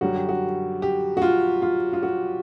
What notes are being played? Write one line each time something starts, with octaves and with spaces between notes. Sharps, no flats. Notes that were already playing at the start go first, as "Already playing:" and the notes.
F#2 D3 G3 F#4
G4
F#4
G4
F#4
F4
F4
F4
F#4